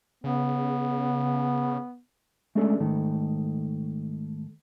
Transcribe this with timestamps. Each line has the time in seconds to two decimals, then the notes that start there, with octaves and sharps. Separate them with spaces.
0.24 C#3 B3
2.55 G#3 A3 C#4 D4 G#4 A4
2.80 G#2 D#3 A3